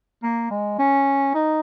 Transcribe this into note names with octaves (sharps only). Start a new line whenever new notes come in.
A#3
G#3
C#4
D#4